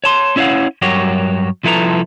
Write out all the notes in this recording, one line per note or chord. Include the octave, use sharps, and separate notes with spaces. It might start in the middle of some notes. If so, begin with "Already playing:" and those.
C#5 A5 C6
C#4 E4 C#5 D5 F5 F#5
G2 F#3 F#4 G4 A#4 C#5
C2 F3 E4 A4 B4 A#5